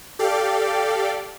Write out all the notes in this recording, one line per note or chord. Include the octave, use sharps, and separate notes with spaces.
G4 A4 D5 F5 G5